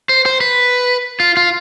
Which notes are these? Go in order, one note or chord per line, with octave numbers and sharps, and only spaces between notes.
C5
C5
B4
F4
F4